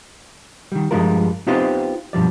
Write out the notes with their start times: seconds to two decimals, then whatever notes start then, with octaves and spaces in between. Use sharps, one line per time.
0.72 D#3 G3
0.91 G2 F3 G3 G#3 F4 A#4
1.47 B3 C4 D#4 F4 G4 C5
2.13 B1 G2 F3 G3 D5